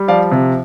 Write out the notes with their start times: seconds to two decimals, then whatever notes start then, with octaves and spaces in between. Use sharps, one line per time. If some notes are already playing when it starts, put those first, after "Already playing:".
Already playing: G3
0.08 F3 D5 F5
0.32 C3